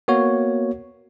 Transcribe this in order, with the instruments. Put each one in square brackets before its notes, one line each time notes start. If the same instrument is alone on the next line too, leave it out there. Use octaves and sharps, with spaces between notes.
[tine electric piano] A#3 B3 F#4 C#5